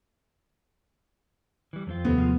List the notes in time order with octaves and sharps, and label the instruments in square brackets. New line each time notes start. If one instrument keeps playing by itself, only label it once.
[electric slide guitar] E3 G3
F2 C4 F4
[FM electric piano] D#2 C3 A3 [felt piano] B3
[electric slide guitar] F3 F4 G#4